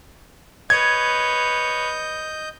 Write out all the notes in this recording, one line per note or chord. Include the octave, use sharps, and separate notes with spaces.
B4 C#5 D#5 G6 G#6